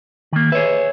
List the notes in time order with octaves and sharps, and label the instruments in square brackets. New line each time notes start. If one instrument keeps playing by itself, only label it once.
[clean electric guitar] D#3 A#3
[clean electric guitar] G#4 E5 [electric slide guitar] B4 C#5